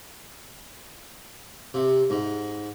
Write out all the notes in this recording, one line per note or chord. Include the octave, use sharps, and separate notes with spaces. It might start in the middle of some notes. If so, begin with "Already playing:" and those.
C3
G#2